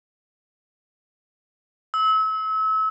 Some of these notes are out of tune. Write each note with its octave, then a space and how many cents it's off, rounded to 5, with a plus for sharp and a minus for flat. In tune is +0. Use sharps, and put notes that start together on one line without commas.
E6 -35